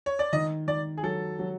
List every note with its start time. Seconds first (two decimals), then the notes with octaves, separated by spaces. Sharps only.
0.06 C#5
0.19 D5
0.33 D#3 D#5
0.67 D#3 D5
0.97 G#4
1.03 F#3 A4
1.39 F#3